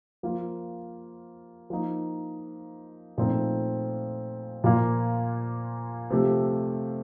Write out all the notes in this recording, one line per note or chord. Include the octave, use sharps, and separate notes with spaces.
F3 A#3 F4
F3 A#3 D#4
A#2 F3 A3 C4 D#4
A#2 F3 A#3 F4
C3 F3 A3